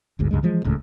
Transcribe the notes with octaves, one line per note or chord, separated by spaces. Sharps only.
G1 D2 G#2
C#2 G2 D3 G#3
E3 F3 G#3
D#1 C#2 A2 C#4